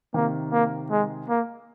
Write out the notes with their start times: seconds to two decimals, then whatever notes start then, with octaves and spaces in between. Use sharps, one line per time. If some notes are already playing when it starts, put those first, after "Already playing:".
0.14 C3 D#3 A#3
0.52 A#3
0.91 G#3
1.29 A#3